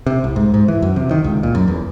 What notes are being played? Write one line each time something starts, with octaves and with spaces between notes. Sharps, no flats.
C3
C2
G#2
G#2
E3
F#2
C3
D#3
C#2
A#2
F#2
E2